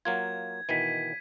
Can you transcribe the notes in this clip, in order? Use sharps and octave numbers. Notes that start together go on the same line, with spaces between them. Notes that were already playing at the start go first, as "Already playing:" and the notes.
F#3 A#3 F4 G#6
B2 D#3 E3 B6 D#7